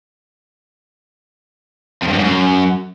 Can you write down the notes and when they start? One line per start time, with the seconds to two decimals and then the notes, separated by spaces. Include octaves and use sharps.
2.02 F2
2.08 G2
2.13 F#2
2.18 G#2
2.24 F#2